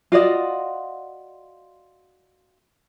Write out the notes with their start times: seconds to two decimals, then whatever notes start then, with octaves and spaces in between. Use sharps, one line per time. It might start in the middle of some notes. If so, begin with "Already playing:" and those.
0.12 F4 F#4 D5 D#5